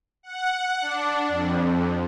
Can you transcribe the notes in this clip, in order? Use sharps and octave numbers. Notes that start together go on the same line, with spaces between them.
F#5
D4
F2